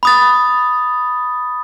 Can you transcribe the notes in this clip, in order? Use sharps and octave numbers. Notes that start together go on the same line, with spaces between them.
B5 D#6 A6